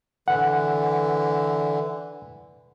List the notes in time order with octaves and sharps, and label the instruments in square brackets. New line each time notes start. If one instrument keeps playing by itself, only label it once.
[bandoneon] D3 E3 [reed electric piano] F#5